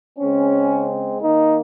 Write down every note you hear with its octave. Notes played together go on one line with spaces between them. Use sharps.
C#3 G#3 C4 C#4
D#3 A#3 D#4